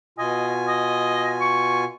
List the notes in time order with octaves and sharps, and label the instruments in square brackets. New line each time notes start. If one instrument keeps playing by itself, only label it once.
[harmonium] B2 F4 G#5 [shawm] D#5
[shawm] D#5
C#6